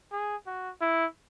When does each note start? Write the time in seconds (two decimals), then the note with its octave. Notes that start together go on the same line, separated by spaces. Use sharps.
0.12 G#4
0.47 F#4
0.81 E4